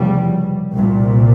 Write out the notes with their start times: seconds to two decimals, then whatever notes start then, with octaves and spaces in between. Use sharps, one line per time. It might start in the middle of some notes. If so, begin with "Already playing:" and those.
Already playing: F1 E2 C#3 G3
0.73 C2 A#2